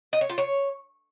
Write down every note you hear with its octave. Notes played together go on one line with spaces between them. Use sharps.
D#5
C#5
F4
C#5